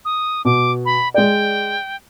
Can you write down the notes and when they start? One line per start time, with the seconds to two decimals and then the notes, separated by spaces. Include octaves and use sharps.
0.05 D#6
0.45 B2 D6
0.85 B5
1.14 G#3 G#4 D5 G5